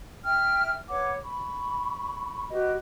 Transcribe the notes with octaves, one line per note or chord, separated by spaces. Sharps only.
E5 G5 F6
B4 C#5 F#5 D6
B5 C#6
F#4 G4 B4 D#5